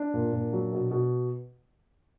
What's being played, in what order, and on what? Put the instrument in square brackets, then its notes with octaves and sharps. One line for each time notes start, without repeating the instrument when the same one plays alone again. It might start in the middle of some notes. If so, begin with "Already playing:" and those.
Already playing: [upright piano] D4
A#2
A#2
F#3
B2
B2